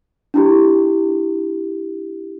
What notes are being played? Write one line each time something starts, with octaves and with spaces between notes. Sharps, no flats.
D4 E4 G4